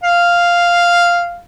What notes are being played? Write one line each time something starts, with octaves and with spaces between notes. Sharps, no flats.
F5